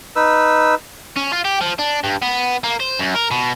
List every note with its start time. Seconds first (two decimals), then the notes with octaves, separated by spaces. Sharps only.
0.16 D#4 B4 E6
1.16 C#4
1.33 F4
1.45 G4
1.61 F3
1.79 D4
2.04 G2
2.22 B3
2.64 A#3
2.80 C5
2.99 F#2
3.15 A#4
3.31 B2